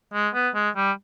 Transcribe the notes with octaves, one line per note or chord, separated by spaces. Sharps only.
G#3
B3
G#3
G3